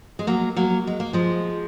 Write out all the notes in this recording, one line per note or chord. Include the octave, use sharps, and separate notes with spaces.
G#3
F#3 A#3
F#3 A#3
G#3
A#3
F3 G#3